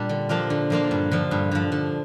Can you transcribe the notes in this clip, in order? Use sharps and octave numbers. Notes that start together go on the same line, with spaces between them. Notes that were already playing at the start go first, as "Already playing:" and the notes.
Already playing: A#2 G3 D4
D3
F3 A#3 D4 F4
D3
F3 A#3 D4 F4
G2
D3 F3
G2
D3 F3
D3